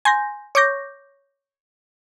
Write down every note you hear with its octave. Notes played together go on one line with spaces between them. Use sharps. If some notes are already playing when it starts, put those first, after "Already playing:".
G#5 C6 G6 A#6
C#5 C#6 D6 G6 A#6